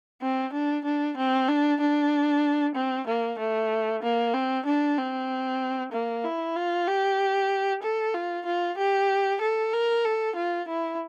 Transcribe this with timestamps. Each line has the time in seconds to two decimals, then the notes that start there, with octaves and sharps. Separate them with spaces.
0.22 C4
0.53 D4
0.85 D4
1.17 C4
1.49 D4
1.80 D4
2.76 C4
3.07 A#3
3.39 A3
4.02 A#3
4.34 C4
4.66 D4
4.97 C4
5.92 A#3
6.24 E4
6.56 F4
6.87 G4
7.83 A4
8.14 F4
8.46 F4
8.78 G4
9.42 A4
9.73 A#4
10.05 A4
10.36 F4
10.68 E4